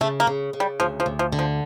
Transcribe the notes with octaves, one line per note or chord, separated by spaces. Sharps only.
C#3 A3
A#3
C#3
C#3
G3
D2 F3
F3
D2
F3
D3
F3